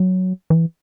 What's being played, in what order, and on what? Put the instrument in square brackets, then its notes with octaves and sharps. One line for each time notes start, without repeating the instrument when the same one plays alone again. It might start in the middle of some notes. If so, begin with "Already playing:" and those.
Already playing: [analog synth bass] F#3
E3